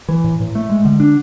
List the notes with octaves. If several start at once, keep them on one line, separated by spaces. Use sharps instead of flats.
E3
A2
A2
A3
G#3
D3
D4